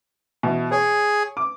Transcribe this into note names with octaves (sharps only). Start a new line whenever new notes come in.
B2 E3
G#4 C#5
D6